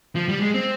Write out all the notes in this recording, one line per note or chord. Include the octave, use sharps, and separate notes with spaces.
F3
G3
G#3
C4